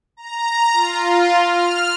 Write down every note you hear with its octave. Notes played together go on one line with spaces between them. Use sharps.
A#5
F4
F6